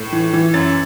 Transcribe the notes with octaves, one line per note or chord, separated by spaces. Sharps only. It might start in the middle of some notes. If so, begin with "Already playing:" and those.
Already playing: A2
E3
E3
F#2 A6